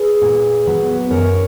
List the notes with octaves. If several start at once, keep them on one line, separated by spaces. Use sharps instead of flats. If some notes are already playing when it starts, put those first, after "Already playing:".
Already playing: G#4 B4
A#2
F#3 B3
F#2 A#4 C#5